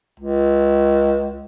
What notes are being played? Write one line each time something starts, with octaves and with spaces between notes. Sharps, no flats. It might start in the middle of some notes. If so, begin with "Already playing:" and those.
C#2